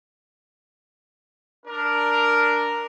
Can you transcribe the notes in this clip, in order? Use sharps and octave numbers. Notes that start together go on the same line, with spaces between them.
D4 A#4